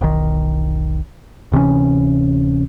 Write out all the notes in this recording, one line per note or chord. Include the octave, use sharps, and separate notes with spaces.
E1 B1 D#3
D1 C3 E3 C#4